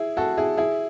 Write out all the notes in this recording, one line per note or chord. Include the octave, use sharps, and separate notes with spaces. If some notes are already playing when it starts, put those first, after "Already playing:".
Already playing: E4 G#4
F#4 A4
E4 G#4
E4 G#4